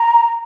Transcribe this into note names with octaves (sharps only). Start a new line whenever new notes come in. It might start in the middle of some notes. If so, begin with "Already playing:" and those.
Already playing: A#5